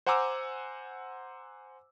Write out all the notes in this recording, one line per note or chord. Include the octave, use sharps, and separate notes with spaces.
C5 F#5 G#5 A#5 D6 E6